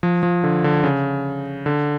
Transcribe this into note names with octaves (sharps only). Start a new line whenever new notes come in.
F3
F3
D3
D3
C#3
D3